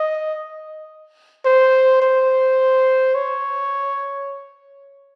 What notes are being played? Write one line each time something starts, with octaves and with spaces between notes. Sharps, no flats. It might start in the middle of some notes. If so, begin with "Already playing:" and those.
Already playing: D#5
C5
C5
C#5